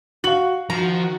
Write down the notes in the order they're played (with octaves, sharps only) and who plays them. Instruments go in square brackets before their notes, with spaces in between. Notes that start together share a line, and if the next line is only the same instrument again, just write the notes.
[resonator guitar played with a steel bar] F#4 [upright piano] F5 F#7
[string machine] D#3 F#4 [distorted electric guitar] F3 F4 [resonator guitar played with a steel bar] A#5